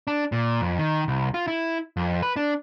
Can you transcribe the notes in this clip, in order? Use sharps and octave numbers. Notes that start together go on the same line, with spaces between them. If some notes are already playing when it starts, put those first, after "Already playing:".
D4
A#2
F2
D#3
C2
F4
E4
F2
B4
D4